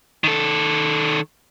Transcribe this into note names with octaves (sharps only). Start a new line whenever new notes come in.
D#3 A4